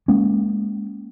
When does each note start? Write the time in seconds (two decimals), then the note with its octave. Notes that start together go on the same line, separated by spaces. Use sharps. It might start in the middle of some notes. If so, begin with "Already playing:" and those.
0.08 G#3 A#3 C#4